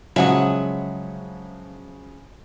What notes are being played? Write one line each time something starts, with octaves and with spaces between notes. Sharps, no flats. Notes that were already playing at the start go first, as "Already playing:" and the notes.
C#3 F3 F#3 G#3 E5 F#5 D#6